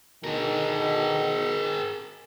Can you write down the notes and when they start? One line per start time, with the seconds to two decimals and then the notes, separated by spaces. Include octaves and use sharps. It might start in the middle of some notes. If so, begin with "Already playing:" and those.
0.24 D2 B2 D#3 G#4 A#4